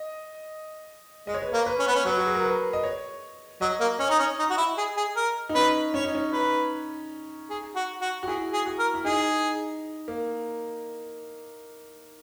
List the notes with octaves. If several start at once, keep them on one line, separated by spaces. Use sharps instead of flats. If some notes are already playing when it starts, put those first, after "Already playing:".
Already playing: D#5
G#3 D#5
C#5
B4
A#3 C#5
B4
C#4
B3
C#4
F#3 B4
F#4
G#4
A#4
B4
D#5
C#5
F#3 D#5
A#3
C#4 D#5
D#4
C#4
D#4
F#4
E4
G#4
G#4
A#4
D#4
C#4 B4
C#4 C#5
D#4
C#4
D#4 B4
G#4
F#4
F#4
F#4
E4 G#4
G#4
F#4
A#4
E4
D#4 G#4
A#3